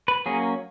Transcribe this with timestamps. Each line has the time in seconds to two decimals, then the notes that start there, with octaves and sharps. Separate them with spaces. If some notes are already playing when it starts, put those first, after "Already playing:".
0.08 B4
0.26 F#3 A#3 C#4 G#4